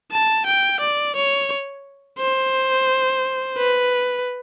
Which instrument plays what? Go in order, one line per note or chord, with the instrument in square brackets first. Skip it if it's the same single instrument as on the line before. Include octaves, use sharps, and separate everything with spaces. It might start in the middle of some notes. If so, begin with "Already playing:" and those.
[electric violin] A5
G5
D5
C#5
C5
B4